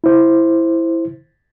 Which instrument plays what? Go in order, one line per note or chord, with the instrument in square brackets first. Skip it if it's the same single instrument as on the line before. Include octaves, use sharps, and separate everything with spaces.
[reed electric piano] E4 C5